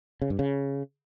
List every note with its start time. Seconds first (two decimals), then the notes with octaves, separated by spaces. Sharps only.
0.22 C#3
0.30 G2
0.39 C#3